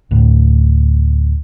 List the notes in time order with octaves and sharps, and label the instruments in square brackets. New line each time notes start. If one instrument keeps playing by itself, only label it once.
[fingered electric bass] D2 A2